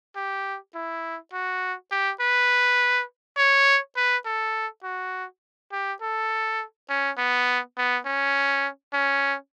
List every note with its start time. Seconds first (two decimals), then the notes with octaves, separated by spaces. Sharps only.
0.16 G4
0.75 E4
1.33 F#4
1.91 G4
2.21 B4
3.37 C#5
3.96 B4
4.26 A4
4.84 F#4
5.72 G4
6.02 A4
6.90 C#4
7.18 B3
7.78 B3
8.06 C#4
8.93 C#4